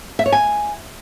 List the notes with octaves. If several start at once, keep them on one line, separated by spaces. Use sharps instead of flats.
E5
C#5
G#5